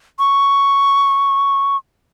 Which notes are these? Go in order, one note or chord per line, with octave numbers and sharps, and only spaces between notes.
C#6